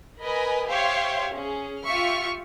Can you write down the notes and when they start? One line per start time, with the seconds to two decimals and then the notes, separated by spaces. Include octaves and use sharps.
0.20 A#4 B4 D#5 G#5 B5
0.68 G4 C5 C#5 E5 F5 C6
1.32 C#4 G#4
1.83 F4 G4 E5 C#6 F6